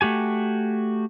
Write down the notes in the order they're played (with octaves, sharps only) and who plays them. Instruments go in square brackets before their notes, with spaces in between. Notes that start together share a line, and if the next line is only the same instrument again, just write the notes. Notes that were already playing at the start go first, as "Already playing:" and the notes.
[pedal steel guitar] A3 F#4 G4 G#5